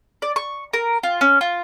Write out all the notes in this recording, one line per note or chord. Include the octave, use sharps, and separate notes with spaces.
D5
C#6
A#4
F4
C#4
F4